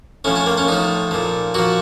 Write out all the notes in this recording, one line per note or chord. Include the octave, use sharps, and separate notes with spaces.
A2 F3 C#4
C#4
A#3
C#4
A2 F3 D#4
A#2 F3
A#2 F3 F#4